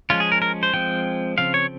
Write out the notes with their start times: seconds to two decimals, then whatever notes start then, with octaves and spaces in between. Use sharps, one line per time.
0.10 F3 G#3 C#4 F4
0.20 G#4
0.32 A#4
0.42 A#4
0.63 C5
0.74 F3 G#3 C4 G5
1.38 C#3 F3 C4 F5
1.54 C#5